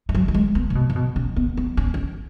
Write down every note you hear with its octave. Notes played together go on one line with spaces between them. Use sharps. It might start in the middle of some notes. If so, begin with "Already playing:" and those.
G#3
F#3
F#3
G#3
B3
C#3
B2
C#3
B2
C#4
B3
B3
C#4
C#4